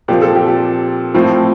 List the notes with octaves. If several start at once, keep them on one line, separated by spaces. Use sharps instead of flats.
A#2 F3 C4 G4
A4
G4
G4
A2 F3 C4